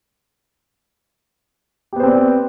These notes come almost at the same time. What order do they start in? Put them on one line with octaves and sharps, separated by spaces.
G4 B3 C5 C4 D5